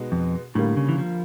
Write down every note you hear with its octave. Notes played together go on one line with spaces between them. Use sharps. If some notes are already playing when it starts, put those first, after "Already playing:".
Already playing: B2 G#3 B3 D#4 F#4
F2
A2 D3 G3 A#3
C#3
E3
F3